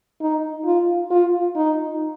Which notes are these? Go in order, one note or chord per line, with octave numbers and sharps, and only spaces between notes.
D#4
F4
F4
D#4